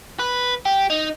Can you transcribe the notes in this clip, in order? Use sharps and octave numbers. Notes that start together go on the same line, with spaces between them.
B4
G4
D#4